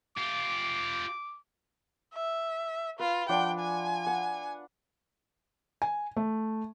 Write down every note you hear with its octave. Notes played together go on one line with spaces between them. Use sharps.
F4 G4 D6
E5
F4 B4
F3 D4 F#5 G5
G#5
F#5
G#5
A3